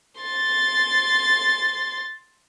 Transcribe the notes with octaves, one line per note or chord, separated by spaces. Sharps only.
C6 A6